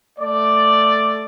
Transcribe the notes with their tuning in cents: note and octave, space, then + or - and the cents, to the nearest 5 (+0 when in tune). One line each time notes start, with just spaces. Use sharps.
A3 +0 D5 +0